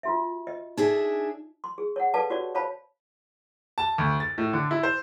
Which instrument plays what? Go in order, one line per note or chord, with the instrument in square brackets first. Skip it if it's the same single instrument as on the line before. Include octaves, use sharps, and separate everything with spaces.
[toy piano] F4 F#4 E5
D#5
[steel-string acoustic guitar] D4 G#4 E5 [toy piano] D#4
[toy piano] C6
G#4
C#5 F#5
A4 B4 D5 F5 A5
C#4 F#4 G4 C#5 D5
C5 C#5 F5 A5 B5
[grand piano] A5
D2
A6
A2
D3
E4
C5